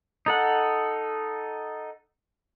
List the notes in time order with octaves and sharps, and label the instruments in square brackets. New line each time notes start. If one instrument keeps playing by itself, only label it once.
[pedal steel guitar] D#4 A4 F#5